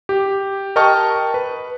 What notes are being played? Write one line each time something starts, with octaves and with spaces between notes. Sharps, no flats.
G4
A#4 D#5 G5 A5 C#6 F6
B4